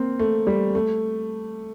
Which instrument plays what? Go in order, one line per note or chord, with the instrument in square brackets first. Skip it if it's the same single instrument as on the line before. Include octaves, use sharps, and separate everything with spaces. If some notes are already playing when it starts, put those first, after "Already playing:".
Already playing: [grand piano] A#3 C4
A3
G3
A3